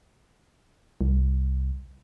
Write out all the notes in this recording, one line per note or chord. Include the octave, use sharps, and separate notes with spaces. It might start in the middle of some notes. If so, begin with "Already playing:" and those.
C2